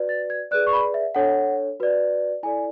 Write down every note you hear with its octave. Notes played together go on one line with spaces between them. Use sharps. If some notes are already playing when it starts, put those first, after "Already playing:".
Already playing: F#4 B4 D5
A6
G#6
G#4 B4 D5 F#6
C#6
B5
E5
D4 A4 C#5 F#5
F#4 B4 D5
E4 A4 D5 G#5